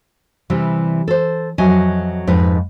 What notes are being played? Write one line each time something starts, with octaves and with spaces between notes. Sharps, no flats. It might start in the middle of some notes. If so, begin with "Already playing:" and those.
C3 E3 G3
A4 C5
F2 F#3 D#5 E5 G#5
F2 G#2 D#4 B4